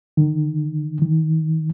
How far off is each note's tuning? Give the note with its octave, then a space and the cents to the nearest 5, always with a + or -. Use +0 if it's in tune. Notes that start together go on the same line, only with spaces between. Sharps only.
D#3 -25
D#3 +30